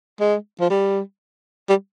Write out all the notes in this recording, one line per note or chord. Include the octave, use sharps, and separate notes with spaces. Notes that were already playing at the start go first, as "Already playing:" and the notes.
G#3
F3
G3
G3